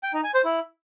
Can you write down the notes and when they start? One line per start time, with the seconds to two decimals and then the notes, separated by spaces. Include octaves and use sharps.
0.03 G5
0.14 D#4
0.24 G#5
0.34 C5
0.45 E4